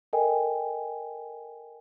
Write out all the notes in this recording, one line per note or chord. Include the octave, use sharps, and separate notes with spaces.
A4 A#4 D#5 G5 G#5